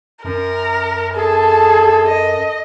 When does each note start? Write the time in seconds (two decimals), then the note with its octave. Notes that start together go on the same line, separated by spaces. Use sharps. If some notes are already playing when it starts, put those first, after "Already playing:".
0.25 F#2 A#4
1.15 G#4 A4 A5
2.06 D#5